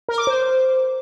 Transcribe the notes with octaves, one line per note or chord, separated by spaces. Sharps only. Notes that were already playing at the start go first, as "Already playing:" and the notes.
A#4
D6
C5